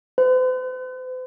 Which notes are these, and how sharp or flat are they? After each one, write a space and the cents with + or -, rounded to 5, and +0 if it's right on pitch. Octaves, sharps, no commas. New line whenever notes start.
C5 -45